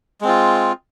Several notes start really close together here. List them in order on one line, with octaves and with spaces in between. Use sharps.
G#3 C4 F4